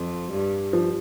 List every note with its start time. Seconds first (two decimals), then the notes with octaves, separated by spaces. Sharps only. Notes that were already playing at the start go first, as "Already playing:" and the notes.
Already playing: F2
0.32 G2
0.73 F3